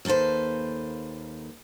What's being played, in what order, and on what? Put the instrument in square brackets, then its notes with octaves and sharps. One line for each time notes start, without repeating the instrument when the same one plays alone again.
[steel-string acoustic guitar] D#2 A#3 A4 B4 C5